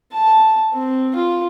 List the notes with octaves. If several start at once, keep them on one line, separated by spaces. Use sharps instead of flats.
A5
C4
F4